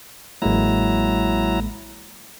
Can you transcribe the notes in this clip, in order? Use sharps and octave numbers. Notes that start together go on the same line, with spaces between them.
A1 F#3 G#3 A#3 E4 A#5